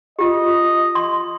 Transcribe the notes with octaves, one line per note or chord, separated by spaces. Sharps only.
F4 G4 D#5
C6